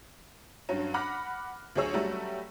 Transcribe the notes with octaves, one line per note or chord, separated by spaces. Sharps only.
G2 F#3 C#4
F#5 B5 D6 F6 F#6 A#6
D2 F#3 G#4 C#5 E6
F#3 G3 A3 C#4